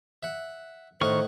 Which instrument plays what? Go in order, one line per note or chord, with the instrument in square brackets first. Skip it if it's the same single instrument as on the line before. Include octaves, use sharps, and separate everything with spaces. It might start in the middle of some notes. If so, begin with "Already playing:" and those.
[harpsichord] E5 F#5
[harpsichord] A2 D#5 F#5 [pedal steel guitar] D#3 C#6 F6 [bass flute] C5